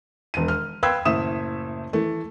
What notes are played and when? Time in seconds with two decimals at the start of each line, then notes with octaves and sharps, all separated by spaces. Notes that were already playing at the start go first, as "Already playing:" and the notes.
0.34 E1 D#7
0.48 F6
0.83 B4 F5 G5 C6 E6 G#6
1.05 F#1 A2 E5 D#6 E7
1.93 E3 A3